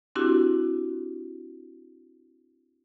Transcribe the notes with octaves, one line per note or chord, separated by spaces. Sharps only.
C4 D4 E4 F#4 G4